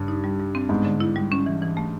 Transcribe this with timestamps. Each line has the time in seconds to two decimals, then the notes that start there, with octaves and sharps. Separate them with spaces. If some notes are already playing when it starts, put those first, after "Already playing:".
Already playing: G2 C#3
0.08 D#4
0.24 G3
0.39 G3
0.55 C4
0.69 G#2 B3
0.85 D3
1.00 E4
1.16 G3
1.32 C#4
1.46 E3
1.62 E3
1.77 A3